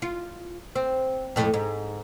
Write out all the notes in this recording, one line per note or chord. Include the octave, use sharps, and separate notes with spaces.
F4
C4
F2 A2 A3
G#2